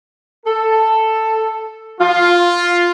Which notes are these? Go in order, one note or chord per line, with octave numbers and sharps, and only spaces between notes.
A4
F4